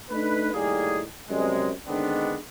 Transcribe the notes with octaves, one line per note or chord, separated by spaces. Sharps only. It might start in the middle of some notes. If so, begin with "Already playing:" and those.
A3 D4 D#4 B4
A2 D#3 G3 A#3 G#4
F#2 C3 G3 G#3
D3 D#3 G#3 B3 C4 D4